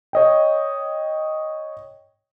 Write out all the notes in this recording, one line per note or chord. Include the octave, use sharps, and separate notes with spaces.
C#5 D#5 G5